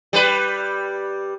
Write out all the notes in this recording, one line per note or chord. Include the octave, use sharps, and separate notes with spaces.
G3 B4